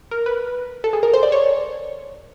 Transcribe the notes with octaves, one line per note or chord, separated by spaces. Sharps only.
A#4
B4
A4
G#4
A#4
C5
D5
C#5